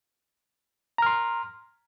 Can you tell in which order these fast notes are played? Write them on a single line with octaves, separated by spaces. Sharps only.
A#5 F6 C6